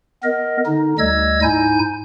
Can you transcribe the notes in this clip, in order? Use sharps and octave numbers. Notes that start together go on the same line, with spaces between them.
B3 A#4 D#5
D3 D#4
D2 G3 D#5 E6 G#6
G#2 D#4 E4 G#5 G6